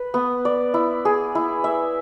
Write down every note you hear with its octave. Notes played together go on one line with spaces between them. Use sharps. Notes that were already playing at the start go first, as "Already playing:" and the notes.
Already playing: B4
B3
D5
E4
G#4
E4
E5